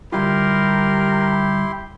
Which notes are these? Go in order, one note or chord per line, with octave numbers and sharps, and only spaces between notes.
D3 G3 E4 F4 G4 A#4 C6